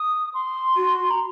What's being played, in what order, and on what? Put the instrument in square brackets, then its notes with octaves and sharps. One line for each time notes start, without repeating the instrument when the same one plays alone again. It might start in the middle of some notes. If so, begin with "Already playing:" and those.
Already playing: [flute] D#6
C6
[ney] F#4
[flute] A#5